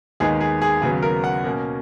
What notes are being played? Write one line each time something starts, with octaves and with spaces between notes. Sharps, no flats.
D#2 D#3 G#3 B3 D#4 G#4
G#4
G#4
D#2 C#3 F#3 B3 G#4
A#4
F#5
B2 A#3 C#4